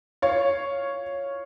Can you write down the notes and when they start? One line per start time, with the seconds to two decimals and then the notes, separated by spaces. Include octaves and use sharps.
0.22 C#5 F5